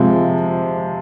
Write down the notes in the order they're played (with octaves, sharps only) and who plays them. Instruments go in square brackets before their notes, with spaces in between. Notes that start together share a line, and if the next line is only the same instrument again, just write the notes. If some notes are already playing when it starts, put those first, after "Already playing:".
Already playing: [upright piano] C3 F3 G#3